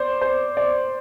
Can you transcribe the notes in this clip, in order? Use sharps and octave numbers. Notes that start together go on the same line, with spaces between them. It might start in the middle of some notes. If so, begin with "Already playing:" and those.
Already playing: C5 D5
C5
D5